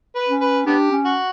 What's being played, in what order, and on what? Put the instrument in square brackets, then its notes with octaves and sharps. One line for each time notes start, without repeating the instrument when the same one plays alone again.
[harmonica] B4
[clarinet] C#4
[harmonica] B4
[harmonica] B3 G4 [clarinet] D4
[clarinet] C#4
[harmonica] F#4